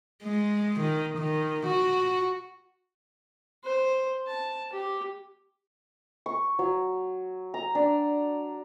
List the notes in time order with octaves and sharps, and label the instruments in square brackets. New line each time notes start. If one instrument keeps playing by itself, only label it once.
[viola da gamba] G#3
D#3
D#3
F#4
[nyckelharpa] C5
A5
G4
[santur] C#6
F#3
A#5
D4